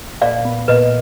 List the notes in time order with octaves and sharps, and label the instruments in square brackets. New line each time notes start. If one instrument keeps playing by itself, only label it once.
[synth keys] A#2 [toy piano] D5 F5
[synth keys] B3
[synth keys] A#2 [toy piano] B4 D#5